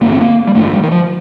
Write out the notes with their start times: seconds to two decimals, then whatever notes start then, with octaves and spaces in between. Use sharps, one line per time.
0.01 A1 G2 D3 A#3
0.12 C4
0.21 A#3
0.47 G3
0.55 A1 G2 D3 A3
0.73 G3
0.83 D#3
0.91 F3